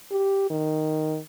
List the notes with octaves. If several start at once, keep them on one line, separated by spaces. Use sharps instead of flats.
G4
D#3